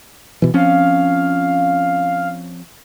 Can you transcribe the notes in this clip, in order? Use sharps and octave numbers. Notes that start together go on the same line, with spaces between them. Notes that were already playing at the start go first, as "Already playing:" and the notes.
B2 E3
F3 C4 C#4 F5